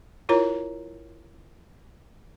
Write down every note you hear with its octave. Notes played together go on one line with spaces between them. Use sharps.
E4 F4 A#4 C#5 A#5